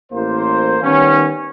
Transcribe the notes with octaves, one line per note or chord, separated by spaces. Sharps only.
A1 A#3 C5
D#3 G3 B3 C#4